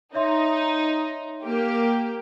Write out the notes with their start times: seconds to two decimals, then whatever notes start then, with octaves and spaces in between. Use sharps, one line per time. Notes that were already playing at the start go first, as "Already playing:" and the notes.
0.15 D#4 C#5 E5 C6
1.44 A#3 G4